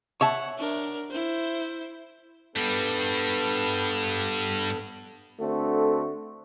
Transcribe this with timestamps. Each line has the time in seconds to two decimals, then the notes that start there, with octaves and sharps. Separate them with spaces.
0.21 C#5 E5 F#5 A5
0.58 D4 A#4
1.10 E4 C5
2.56 G2 G3 B3 A4 B4
5.40 D3 A3 C4 F#4